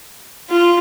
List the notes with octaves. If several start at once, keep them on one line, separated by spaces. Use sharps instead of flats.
F4